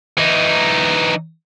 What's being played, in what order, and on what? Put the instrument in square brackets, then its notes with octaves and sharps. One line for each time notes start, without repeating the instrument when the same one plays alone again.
[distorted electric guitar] E3 D#4